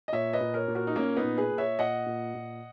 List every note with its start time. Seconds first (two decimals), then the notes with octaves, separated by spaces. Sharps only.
0.08 D#5
0.12 A#2 C#5 E5
0.33 B4 D#5
0.41 A#2
0.54 A#4 C#5
0.68 A#2
0.75 F#4 A#4
0.87 D#4
0.96 A#2 A#3 C#4
1.17 B3 D#4
1.23 A#2
1.38 G#4 B4
1.51 A#2
1.58 C#5 E5
1.79 A#2 D#5 F#5
2.06 A#2
2.35 A#2